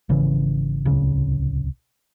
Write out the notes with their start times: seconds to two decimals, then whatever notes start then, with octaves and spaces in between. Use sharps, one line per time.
0.09 G#1 C#3 E3 C#4
0.85 D1 C2 C#3